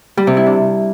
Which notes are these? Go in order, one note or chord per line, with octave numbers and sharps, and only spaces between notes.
G3
C3
E4
D4